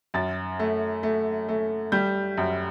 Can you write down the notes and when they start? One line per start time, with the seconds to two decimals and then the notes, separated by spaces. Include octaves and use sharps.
0.14 F#2 A6
0.60 A3
1.03 A3
1.49 A3
1.92 G3 G6
2.37 F#2